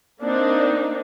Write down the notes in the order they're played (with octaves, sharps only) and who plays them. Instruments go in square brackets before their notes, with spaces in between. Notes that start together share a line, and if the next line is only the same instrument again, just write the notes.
[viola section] A#3 C4 D4 D#4